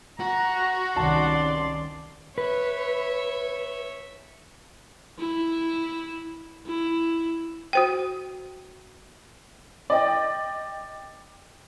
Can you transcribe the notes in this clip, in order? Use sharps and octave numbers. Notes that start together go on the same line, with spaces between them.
F#4 A#5
C2 D#3 C#4 D5 A5 C6
B4 C#5 E5
E4
E4
F#4 C5 G5
D5 D#5 G5